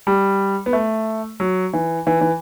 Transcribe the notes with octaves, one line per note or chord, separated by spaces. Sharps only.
G3
B3
A3
F#3
E3
E3
E3